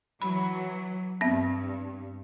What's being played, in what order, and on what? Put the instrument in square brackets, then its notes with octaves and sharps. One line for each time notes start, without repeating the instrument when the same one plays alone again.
[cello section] E3 F#3 [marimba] B5
[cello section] G2 [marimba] B3 C4 E5